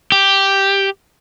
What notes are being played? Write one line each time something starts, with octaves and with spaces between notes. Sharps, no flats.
G4